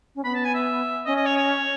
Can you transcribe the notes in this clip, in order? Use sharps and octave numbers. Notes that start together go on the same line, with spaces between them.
C#4
B3 B5
A5
G#5
E5
C#4 D#5
D#5
C#5
C#5